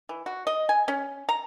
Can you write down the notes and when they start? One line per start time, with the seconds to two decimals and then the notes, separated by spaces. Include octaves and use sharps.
0.09 E3
0.26 F#4
0.47 D#5
0.69 G#5
0.88 C#4
1.29 A#5